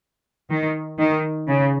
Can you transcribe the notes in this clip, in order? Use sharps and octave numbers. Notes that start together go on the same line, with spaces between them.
D#3
D#3
C#3